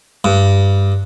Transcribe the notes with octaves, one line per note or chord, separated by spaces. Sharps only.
G2